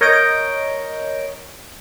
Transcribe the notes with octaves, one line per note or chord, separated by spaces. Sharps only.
A#4 C#5 D#5 G6 A#6 D7